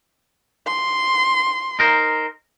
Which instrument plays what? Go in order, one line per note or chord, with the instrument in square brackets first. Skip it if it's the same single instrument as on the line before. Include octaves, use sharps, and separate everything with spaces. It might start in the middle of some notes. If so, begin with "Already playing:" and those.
[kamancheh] C6
[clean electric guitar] D#4 A#4 C5